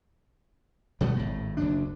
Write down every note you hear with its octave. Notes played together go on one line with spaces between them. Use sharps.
B2 G3 A3 B3
G#1 A2
F#1 D2 D4